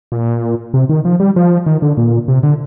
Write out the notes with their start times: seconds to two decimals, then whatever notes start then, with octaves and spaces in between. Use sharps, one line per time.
0.12 A#2
0.74 C3
0.89 D#3
1.05 F3
1.20 G3
1.36 F3
1.66 D#3
1.82 D3
1.97 A#2
2.28 C3
2.43 D3